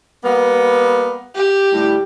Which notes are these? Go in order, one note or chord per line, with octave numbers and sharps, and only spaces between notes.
G3 A#3 B3
G4
A2 D3 G3